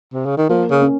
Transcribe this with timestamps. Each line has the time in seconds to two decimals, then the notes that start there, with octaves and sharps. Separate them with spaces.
0.13 C3
0.26 C#3
0.38 D#3
0.49 F3 A#3
0.71 C#3
0.82 C#4